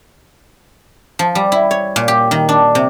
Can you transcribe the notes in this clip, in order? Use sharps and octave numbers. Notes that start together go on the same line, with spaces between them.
F3
G3
E4
C#5
A#2
G4
D#3
D4
C3